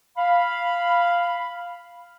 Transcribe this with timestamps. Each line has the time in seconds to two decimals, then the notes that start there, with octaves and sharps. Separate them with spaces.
0.17 F5 B5